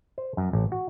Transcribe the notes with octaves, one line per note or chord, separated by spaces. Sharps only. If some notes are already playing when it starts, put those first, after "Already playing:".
C5
F#2
A1
F#4